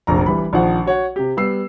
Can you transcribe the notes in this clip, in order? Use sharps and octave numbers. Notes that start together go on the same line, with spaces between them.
F1 A#1 A#5
E3 G3 B5
A#1 D#3 F3 F#5
F#4 C#5 F#5
C3 G4
G3 B3 E6 C7